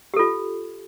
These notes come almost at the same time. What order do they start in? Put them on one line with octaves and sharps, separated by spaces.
G4 A4 F4